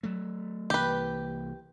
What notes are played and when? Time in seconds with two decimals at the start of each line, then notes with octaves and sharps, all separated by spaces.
0.03 F#3 A3
0.70 C2 E3 A#3 G4 B4